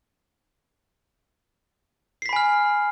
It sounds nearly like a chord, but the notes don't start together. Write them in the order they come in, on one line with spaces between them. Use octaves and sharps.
C7 B6 B5 G#5 F6